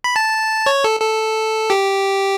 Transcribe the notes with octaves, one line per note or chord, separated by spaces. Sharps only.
B5
A5
C#5
A4
A4
G4